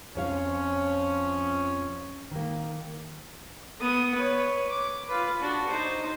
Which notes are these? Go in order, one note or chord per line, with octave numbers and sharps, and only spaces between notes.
F2 F3 C#4 C#5 F5
D#3 A#3
B3 D#6
B4 C#5
D6
F4 B4
D4 F#4
D#4 C5